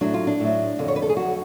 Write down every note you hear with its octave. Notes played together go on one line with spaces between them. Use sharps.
A2 F#3 D4
F4
D4
A2 F#3
F2 D3 F#3
C#5
B4
A4
G#4
F2 D3 F#3 F#4